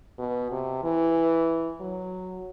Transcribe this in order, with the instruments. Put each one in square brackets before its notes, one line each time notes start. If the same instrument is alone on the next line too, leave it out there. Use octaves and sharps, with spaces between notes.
[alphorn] B2
C3
E3
F#3